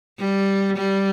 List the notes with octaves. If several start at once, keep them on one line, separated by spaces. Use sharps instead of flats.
G3
G3